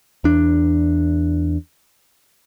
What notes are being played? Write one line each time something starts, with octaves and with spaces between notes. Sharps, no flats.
E2 D4